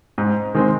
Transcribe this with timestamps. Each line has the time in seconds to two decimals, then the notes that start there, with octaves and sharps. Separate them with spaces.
0.18 G#2
0.55 D#3 G#3 C4